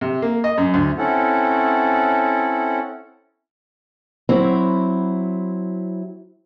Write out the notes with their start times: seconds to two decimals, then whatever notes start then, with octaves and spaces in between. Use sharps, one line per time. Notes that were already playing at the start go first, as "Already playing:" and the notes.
0.01 C3
0.22 A#3
0.44 D#5
0.58 F#2
0.74 D2
0.97 C4 C#4 E4 A4 F#5
4.29 F#3 C4 E4